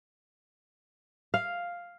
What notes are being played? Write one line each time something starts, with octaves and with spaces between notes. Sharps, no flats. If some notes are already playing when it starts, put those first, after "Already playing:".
F5